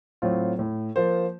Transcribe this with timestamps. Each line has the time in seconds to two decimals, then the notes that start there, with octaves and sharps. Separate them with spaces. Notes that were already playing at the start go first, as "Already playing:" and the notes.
0.22 A2 F#3 C4 F4
0.59 A2
0.96 F3 A#3 F4 C5